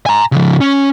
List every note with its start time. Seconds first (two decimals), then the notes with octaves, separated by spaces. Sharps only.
0.06 G#5 A#5
0.32 C#3 F3
0.61 C#4